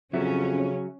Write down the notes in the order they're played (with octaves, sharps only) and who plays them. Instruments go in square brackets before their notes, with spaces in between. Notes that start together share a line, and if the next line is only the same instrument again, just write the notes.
[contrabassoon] F2 [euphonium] C#3 [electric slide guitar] F#3 F#4 E5 [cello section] C#4